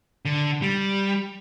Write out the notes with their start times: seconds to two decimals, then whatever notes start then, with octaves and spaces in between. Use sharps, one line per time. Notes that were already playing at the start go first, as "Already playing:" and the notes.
0.25 D3
0.62 G3